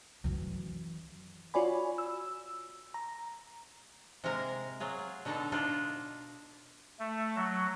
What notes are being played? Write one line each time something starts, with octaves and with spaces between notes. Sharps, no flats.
F#2 E3
F4 F#4 C#5 D5 G#5 B5
E6
A#5
C3 G#3 A#3 A#4
F#3 F4 G#4
B2 D3 D#4 A4 A#5
D4 D#4 F4
A3
F#3